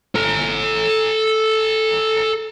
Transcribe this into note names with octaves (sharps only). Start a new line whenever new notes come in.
A4 A#5